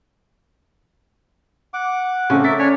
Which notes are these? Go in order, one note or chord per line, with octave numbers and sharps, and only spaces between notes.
F#5 D6
C#3 A3 C4 C#4
A#4 E5 A6 B6
D4 C#5 G#5